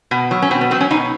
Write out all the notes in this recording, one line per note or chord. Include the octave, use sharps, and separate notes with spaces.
B2
F#3
C#4
B2 C4
B3
F#3 C4
C#4
B2 D#4